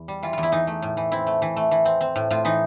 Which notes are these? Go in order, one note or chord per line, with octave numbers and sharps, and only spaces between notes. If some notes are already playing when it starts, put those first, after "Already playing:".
Already playing: E2
G3
E3 F4
E2 F4
E4
E3 D#4
A3
A2
E3
C4 E4
A3
E3
A3
E3
C4
C4
A2
A2 F4
E3 D#4